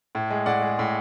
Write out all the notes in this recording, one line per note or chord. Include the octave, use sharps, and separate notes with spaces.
A2
G#3
A2 D5 F#5
G#3
A2